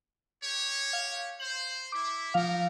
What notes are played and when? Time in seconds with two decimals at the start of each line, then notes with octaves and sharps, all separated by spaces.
0.42 G4 C#5
0.93 F5
1.40 C5 F#7
1.92 E4 D6
2.34 F3 A3 D#4 A#4 F5